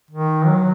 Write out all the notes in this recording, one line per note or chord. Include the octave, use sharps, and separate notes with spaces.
D#3
F#3